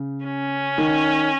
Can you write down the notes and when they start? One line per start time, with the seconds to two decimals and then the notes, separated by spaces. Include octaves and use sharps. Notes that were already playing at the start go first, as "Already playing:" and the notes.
Already playing: C#3
0.25 C#4
0.78 D#3